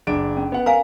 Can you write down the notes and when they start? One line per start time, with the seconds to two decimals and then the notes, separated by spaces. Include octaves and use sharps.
0.07 F#1 D4 D7
0.37 C#4
0.52 B3 F#5
0.66 A#4 F5 G#5 A#5